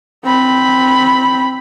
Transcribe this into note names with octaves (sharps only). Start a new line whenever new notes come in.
C4 B5